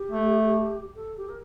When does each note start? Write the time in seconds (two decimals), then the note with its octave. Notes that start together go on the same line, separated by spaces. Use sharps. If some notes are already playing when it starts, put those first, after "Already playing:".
Already playing: G4
0.11 A3
0.95 A4
1.18 G4
1.28 A#4